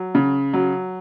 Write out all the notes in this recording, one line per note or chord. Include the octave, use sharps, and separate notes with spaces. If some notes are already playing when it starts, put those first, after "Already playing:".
Already playing: F#3
C#3
F#3